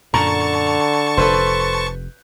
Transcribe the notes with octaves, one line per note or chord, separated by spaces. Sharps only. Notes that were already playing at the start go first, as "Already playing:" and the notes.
F#2 A#2 D3 A5 A#5 C#6
F1 A4 B4 C5